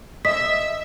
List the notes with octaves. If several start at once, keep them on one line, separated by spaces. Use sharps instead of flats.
D#5 E5 E6 B6